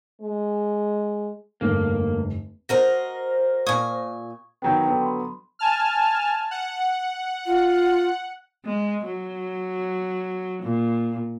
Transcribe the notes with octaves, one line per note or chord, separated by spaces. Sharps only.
G#3
F1 G2 D3 A#3
F#4 A#4 C5 D#5 F6 A#6
A#2 G#5 C#6 D#6 G#6
D#3 F#3 B3 G5 G6
D3 F#3 B3
B5 C6
G#5 A5 F6
F#5
F4
G#3
F#3
A#2